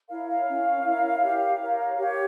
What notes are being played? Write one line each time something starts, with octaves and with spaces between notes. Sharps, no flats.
E4 A#4 C#5 F5
F5
C#4
E4 A#4 C#5
G4
A#4 C#5
G4 C#5